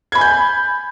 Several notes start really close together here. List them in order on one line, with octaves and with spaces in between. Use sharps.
G#6 B5 G#5 G6